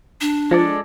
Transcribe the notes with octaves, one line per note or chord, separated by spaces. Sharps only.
D4
F3 G#3 A4 D5